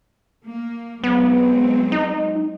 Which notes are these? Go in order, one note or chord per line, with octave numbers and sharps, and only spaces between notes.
A#3
F#3 G#3 B3 C4
D#4